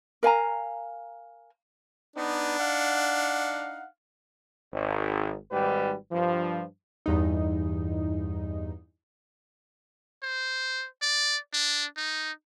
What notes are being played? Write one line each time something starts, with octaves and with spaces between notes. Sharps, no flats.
A#4 F5 G#5 A#5
B3 D4 D#4
D#4 F5 F#5
G#1
G#1 G#2 G3 G4 B4
G2 F3
E2 G2 D#4
C5
D5
D4
D#4